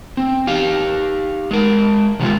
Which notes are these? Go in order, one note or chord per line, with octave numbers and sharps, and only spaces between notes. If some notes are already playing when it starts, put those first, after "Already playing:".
C4
D#4 G4 F5
G#3 A#4
C3 D#3 G#3 F4